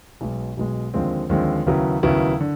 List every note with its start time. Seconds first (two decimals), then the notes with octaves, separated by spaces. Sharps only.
0.21 B1 B2 G#3
0.57 B1 B2 G#3
0.94 D#2 D3 F3 G#3 C4
1.29 D#2 D3 F3 G#3 C4
1.66 D#2 C#3 F#3 B3 E4
2.03 D#2 C#3 F#3 B3 E4
2.41 D3